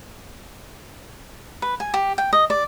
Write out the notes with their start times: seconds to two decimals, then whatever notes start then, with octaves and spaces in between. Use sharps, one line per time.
1.62 B4
1.80 G#5
1.94 G4
2.18 G5
2.33 D#5
2.50 D5